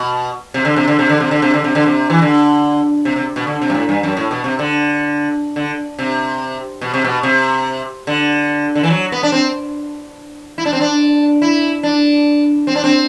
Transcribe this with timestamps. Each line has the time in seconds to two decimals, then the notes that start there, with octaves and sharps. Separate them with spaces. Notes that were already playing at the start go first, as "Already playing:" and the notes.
Already playing: B2
0.54 C3
0.65 D3
0.76 C3
0.88 D3
0.99 C3
1.09 D3
1.20 C3
1.31 D3
1.42 C3
1.54 D3
1.64 C3
1.75 D3
1.86 C3
2.10 E3
2.22 D3
3.05 C3
3.16 C3
3.36 B2
3.47 D3
3.62 C3
3.70 G2
3.75 A2
3.89 G2
4.03 F#2
4.17 A2
4.31 B2
4.44 C3
4.59 D3
5.56 D3
5.99 C3
6.81 B2
6.94 C3
7.05 B2
7.23 C3
8.07 D3
8.75 D3
8.83 E3
8.90 F#3
9.12 B3
9.23 D4
9.32 C4
10.58 E4
10.65 D4
10.73 C4
10.81 D4
11.42 E4
11.83 D4
12.67 C4
12.75 D4
12.84 C4